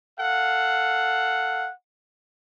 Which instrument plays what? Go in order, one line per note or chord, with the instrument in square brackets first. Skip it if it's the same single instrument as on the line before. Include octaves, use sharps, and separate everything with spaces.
[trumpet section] A4 F5 F#5